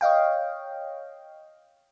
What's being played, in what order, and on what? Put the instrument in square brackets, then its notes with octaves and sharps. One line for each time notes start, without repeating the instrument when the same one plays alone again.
[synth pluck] C#5 D#5 F5 G5